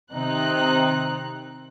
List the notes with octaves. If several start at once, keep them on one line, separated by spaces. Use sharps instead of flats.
C3 D#3 C4 D#4 F#6